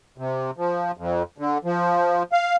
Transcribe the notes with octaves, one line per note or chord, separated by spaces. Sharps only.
C3
F3
F2
D3
F3
F5